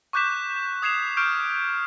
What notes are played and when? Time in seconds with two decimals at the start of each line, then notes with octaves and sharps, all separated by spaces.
0.13 C#6 D6 F#6 G6 B6 E7
0.82 D#6 G#6 C7 E7 F7
1.17 C#6 F6 G6 D7